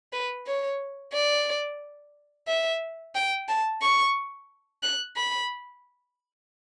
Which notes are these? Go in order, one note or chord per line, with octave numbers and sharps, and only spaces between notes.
B4
C#5
D5
E5
G5
A5
C#6
F#6
B5